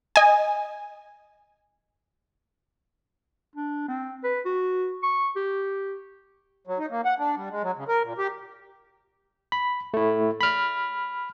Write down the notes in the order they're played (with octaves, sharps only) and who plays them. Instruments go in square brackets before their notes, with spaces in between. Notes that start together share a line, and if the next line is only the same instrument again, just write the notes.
[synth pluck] D#5 G#5
[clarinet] D4
C4
B4
F#4
C#6
G4
[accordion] F#3
D#4
A#3
F#5
D4
G3
G#3
F#3
C#3
A#4
A#2
G4
[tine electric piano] B5
A3 E4
B5 F6